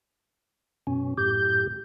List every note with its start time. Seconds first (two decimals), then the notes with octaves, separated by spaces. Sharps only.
0.87 F#2 B2 C#4
1.18 F#2 A2 G4 G6